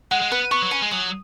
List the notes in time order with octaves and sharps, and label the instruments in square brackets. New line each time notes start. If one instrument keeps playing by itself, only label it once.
[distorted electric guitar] G#3 [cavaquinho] F#5
[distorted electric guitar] G#3
[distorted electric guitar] B3 [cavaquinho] B4
[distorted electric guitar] B3 [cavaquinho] C#6
[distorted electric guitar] F#3
[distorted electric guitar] C#4 [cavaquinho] G#5
[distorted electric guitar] G#3
[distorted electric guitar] F#3 [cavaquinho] D#6